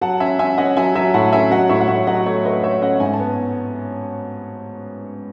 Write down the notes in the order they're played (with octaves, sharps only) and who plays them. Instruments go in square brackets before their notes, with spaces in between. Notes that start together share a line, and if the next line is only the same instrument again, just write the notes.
[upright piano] F#3 F#5 A5
C#4 E5 G#5
C#4 E5 G#5
C#4 D#5 F#5
F#3 E5 G#5
F#3 E5 G#5
A2 F#5 A5
C#4 E5 G#5
F#3 D#5 F#5
A2 C#5 E5
F#5
A2 C#5 E5
F#3 D#5 F#5
A3 C#5
A3 B4 D#5
A3 C#5 E5
C#4 D#5 F#5
G#2 G#5
A5
B3